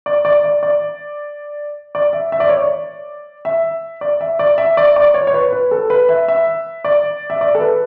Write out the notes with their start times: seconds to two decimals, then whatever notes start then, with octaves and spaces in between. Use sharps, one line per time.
0.06 D5
0.25 D5
0.44 D5
0.63 D5
1.95 D5
2.13 E5
2.32 E5
2.40 D5
2.49 C#5
2.57 D5
3.45 E5
4.01 D5
4.21 E5
4.39 D5
4.58 E5
4.77 D5
4.96 D5
5.14 C#5
5.27 C#5
5.34 B4
5.53 B4
5.71 A4
5.90 B4
6.09 E5
6.28 E5
6.84 D5
7.30 E5
7.41 D5
7.55 A4
7.60 B4